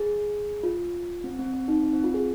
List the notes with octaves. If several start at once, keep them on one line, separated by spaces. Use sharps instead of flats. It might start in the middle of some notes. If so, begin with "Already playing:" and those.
Already playing: G#4
F4
C4
C4
C4
D#4
C4
C4
F4
G#4